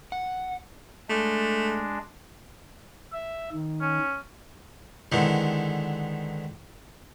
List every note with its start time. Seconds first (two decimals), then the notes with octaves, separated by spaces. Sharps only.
0.12 F#5
1.09 G#3 A3 D4
3.13 E5
3.52 D#3
3.81 C#4
5.12 D3 D#3 G#3 B3 C4 E4